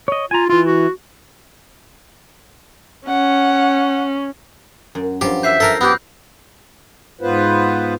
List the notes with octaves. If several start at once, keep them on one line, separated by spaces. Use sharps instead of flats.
C#5 D#5
F4 G#5 A#5
E3 E4 F4
F#4
C#4 F#5
F#2
G2 F3 F#3 G4
B4 E5 G6 C7
A4 A#4 G#5 E6 A#6
B3 G4 B5 F#6 G6
G#2 B3 F4 B4 C5